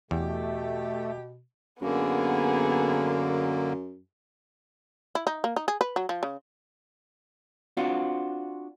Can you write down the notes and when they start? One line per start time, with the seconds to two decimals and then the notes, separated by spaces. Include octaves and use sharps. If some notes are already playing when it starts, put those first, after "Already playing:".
0.11 E2 B2 A3 G4
1.82 F#2 D3 A#3 B3 G#4
5.15 E4
5.27 D#4
5.44 A#3
5.56 D#4
5.68 G#4
5.81 B4
5.96 F#3
6.09 F3
6.23 C#3
7.77 C4 D4 F4 F#4